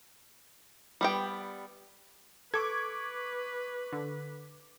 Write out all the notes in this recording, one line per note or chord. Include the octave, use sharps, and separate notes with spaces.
G3 B3 G5
A4 B4 C#6 D6 G#6
D3